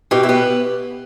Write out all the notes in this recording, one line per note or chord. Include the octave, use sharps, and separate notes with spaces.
B2 G4
E4
B3 G4